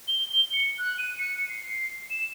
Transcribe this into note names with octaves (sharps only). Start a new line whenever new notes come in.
G7
C#7
F#6
D#7
C#7
C7
E7